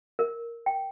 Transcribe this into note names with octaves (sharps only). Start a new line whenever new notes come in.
A#4
G5